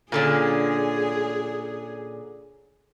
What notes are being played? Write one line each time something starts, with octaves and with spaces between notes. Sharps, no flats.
A#2 D3 C#4 G#4